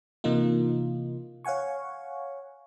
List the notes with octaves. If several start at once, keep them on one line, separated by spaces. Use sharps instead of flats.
C3 E3 A#3 D#4 F4
C#5 F5 F#5 G#5 C#6